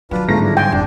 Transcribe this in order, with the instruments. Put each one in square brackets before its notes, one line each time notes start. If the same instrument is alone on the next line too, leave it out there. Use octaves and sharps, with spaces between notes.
[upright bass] D#3 F#3 [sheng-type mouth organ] D4 F4 B4
[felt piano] G1 G#2 A#6 [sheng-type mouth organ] A3 F4 A#5
[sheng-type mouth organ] D4 E4
[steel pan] G5 [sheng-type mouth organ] G#5 C6
[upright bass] F1 E4 [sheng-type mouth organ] D4